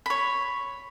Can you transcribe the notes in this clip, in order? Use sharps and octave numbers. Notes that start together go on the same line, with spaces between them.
C#5 B5